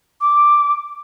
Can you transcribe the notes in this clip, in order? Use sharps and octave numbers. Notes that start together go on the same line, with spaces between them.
D6